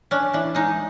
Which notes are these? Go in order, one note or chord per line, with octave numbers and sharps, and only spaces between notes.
C#4 D4
E3 D4
G#3 D#4